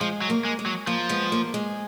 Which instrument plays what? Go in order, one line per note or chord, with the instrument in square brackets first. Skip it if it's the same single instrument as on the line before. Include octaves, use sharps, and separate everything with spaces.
[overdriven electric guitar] F3 [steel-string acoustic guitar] G#3
[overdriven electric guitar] F#3
[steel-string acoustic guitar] A#3
[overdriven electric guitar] G#3
[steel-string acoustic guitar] G#3
[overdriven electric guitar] F#3
[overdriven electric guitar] F3 [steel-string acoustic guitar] A#3
[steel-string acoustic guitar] G#3 B3
A#3
G#3